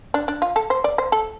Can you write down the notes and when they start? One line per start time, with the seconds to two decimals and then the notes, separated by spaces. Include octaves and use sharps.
0.14 D4
0.28 D4
0.42 F4
0.56 A4
0.70 C5
0.84 D5
0.98 C5
1.12 A4